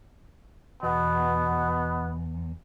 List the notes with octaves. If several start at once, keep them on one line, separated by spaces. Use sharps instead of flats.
E2 B2 B3